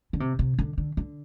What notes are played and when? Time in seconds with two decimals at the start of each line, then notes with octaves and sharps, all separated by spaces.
0.13 D3
0.20 C3
0.39 C3
0.59 D3
0.78 D3
0.97 D3